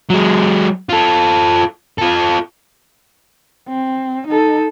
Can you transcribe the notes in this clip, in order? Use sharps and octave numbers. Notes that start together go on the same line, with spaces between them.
F#3 G#3
F4 A4
F4 A4
C4
D#4 A4